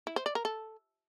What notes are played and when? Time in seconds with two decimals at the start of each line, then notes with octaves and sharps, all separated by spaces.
0.07 E4
0.16 C5
0.26 D5
0.35 A#4
0.45 A4